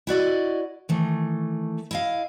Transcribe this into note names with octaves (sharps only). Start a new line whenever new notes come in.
E4 F#4 D5 D#5
D#3 E3 A3
E4 D#5 F5